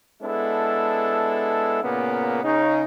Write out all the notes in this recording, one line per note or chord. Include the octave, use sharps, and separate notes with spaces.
G#3 B3 D4 E4 A4
A#2 C#3 A#3 B3
C#3 D#4